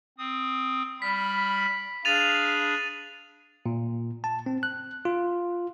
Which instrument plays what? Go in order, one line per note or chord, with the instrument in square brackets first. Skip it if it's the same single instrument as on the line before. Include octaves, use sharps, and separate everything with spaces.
[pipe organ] C4 D#6
[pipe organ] G3 F6 [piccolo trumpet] B5 [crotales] B6
[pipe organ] D4 G#4 B5 [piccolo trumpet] F5 [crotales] A6 D#7 F7
[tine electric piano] A#2
A5
C4
F#6
F4